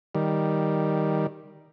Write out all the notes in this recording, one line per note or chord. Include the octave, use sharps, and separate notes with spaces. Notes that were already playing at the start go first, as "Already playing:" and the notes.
D#3 G3